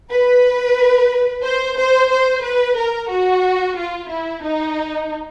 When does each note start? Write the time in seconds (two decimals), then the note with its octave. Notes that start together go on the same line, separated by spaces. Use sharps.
0.10 B4
1.43 C5
1.76 C5
2.09 C5
2.42 B4
2.76 A#4
3.09 F#4
3.76 F4
4.09 E4
4.42 D#4